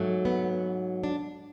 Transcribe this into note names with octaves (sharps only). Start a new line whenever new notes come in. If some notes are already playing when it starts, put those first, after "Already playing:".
Already playing: G#2 F#3 A3
B3
D4